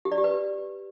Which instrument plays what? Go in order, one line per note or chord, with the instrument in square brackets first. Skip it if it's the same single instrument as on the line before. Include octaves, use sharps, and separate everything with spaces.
[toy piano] G4
D5
G4
B4